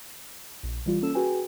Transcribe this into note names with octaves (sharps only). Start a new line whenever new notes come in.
A#1
E3 G3 F4
A#3 C#4 A4 E6 E7
F#4 G#4 B4 G5 G#5